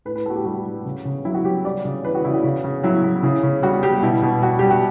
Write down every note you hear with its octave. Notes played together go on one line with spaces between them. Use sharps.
A2 B4
B4
A2 F#4 A4
G4
G3 F#4
G3
C#3
C#3
F#3 E4
F#4
F#3 G4
G3 D5
C#3
E3 B4
F#4
C#3 E4
F#4
C#3
C#3
F#3 E4
F#3
C#3 E4
C#3
G3 F#4
G3 G4
B2 E4
B2
G3 F#4
G3 G4
F#4